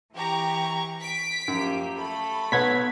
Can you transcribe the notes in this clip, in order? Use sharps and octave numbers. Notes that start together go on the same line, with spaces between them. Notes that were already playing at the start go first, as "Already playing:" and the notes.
E3 G4 A#5 C#6
B6 D7
F#2 F3 A#3 G4
A3 A4 B5
B1 B3 C#5 F#5 G#6 B6